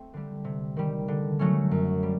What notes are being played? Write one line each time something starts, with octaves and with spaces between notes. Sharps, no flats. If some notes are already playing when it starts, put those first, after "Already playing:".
Already playing: A3 C4
D3 G3
C3
D#3 G3
D3
F#3 A3 C#4
F#2
G3